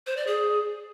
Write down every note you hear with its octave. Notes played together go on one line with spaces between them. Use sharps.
C5
D5
G#4